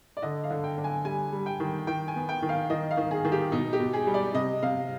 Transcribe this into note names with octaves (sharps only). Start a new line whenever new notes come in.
D5
D3 D#5
F5
D3
G5
D3
G#5
G3 G#5
G3
G5
D#3
D#3 G5
G#5
B3
G5
D#3
F5
D#3 D#5
F5
D#3
G#4
D#3
G4
B2 D#4
G4
B2
G#4
G3
D5
C3 D#5
C3 F5